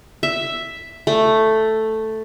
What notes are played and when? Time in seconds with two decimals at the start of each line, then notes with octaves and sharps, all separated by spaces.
0.23 E5
1.07 A3